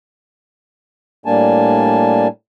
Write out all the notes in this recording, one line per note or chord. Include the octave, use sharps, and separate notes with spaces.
A2 G3 A#3 D4 G#5 A5